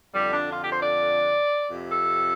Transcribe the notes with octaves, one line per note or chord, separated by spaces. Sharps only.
F2 D3 G3
D4
F4
G4
C5
D5
F2 C3
A4